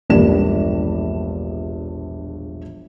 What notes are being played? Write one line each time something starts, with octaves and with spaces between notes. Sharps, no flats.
E1 A#1 G2 D5 E7